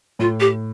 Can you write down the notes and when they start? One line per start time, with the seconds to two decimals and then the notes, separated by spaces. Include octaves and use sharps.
0.19 A2 F4
0.40 G4